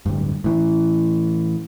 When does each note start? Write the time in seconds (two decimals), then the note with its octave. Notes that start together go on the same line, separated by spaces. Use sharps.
0.06 D1 G2
0.44 A2 E3